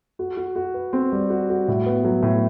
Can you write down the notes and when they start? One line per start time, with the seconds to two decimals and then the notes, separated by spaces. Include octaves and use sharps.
0.19 F#4
0.37 F#4
0.56 F#4
0.74 B4
0.93 C4
1.12 G3
1.30 F#4
1.50 F#4
1.68 A2
1.86 B3
2.04 F#3
2.23 A2